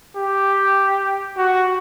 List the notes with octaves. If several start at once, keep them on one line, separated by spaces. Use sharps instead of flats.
G4
F#4